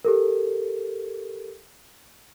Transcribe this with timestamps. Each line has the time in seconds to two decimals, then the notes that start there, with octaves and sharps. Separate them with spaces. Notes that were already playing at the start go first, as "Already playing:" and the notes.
0.05 G4 A4 A#4